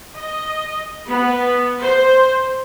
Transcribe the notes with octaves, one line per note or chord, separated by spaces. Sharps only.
D#5
B3
C5